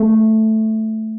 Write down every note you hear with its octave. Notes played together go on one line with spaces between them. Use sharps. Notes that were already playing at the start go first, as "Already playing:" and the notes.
Already playing: A3